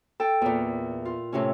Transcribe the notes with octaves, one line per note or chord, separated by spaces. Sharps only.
A4 G5
E2 A#2
F4
A2 C3 C#4